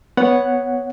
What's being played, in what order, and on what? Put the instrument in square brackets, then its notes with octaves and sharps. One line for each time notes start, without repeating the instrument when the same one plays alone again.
[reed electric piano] B3 C#5 F#5